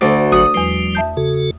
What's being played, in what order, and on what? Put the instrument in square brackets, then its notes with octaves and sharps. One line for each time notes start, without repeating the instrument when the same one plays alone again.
[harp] D2 D5 [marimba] A4 C5
[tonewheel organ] G#1 F#3 [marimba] F#4 [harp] D#6
[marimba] E2 B4 [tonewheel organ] F3 G3
[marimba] E5 A5 G6
[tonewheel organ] C#3 F#4 A4